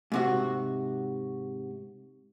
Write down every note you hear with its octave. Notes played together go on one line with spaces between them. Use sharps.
G#2 C3 F#4